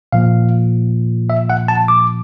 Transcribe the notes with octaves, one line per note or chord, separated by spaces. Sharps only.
A#2 F3 A#3 F5
E5
F#5
A5
D6